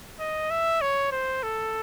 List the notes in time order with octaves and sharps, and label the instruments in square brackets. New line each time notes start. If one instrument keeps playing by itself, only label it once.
[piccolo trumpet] D#5
E5
C#5
C5
A4